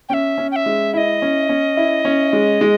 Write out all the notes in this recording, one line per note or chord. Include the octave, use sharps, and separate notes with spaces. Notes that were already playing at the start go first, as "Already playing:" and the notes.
C#4 E5 G5
C#4
G5
E5
G#3
E4 D#5 E5
C#4
C#4
E4
C#4
G#3
G#3